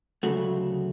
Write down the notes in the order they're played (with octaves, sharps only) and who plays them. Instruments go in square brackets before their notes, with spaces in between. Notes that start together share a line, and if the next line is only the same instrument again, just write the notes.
[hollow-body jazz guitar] D2 C#3 F#3 A3 F#4